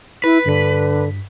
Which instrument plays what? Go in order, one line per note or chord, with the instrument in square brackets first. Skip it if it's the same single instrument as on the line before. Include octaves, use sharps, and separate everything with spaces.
[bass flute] E4 [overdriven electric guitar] B4
[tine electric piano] G2 B6 [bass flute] D3